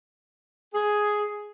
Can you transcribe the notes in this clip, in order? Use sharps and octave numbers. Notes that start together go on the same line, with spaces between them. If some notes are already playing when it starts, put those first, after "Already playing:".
G#4